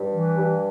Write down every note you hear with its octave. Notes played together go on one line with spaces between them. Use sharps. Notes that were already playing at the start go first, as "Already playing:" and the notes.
Already playing: G2
E3
G2